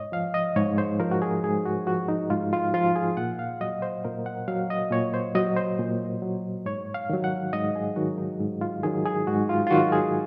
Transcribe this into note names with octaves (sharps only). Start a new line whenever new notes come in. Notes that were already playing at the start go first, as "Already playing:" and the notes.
Already playing: G#2 C#5 D#5
F3 F5
D#5
G#2 C#5
C5
F3 A#4
F#4
G#4
G#2 G#4
F#4
F3 F#4
D#4
G#2 F4
F4
F3 F4
G#4
A#2 F#5
F5
F#3 D#5
C5
A#2 A#4
F#5
F#3 F5
D#5
A#2 C#5
C5
F#3 D#5
C5
A#2
F#3
G#2 C#5
F5
D#3 F#3
F#5
G#2 D#5
G#4
D#3 F#3 F#4
D#4
G#2
F4
D#3 F#3 G#4
G#4
G#2 F#4
F4
F4
D#3 F#3 F#4
G#4